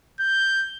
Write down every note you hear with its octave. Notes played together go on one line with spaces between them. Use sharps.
G6